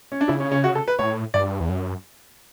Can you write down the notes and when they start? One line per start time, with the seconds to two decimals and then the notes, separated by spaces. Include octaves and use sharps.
0.12 C#4
0.21 D4
0.28 C#3 E4
0.40 C#4
0.51 C#4
0.64 F#4
0.75 A4
0.88 B4
0.99 A2 C#5
1.34 G2 D5
1.60 E2
1.69 F#2